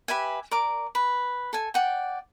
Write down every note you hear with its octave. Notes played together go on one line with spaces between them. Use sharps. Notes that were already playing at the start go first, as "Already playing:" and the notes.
G4 B4 E5 G#5
A#4 D5 D6
B4
A4 G#5
D5 F#5 G5